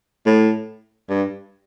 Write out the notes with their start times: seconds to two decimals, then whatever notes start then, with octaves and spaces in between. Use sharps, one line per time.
0.26 A2
1.10 G2